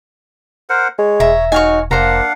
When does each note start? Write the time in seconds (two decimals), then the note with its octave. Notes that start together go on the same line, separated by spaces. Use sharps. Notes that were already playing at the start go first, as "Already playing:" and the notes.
0.69 A#4 C5 F#5
0.99 G#3 C#5
1.20 E1 E5 A#5
1.52 D#4 F#4 C#5 F5 G#5
1.91 F1 A#3 D4 C5 F5 F#5 A#5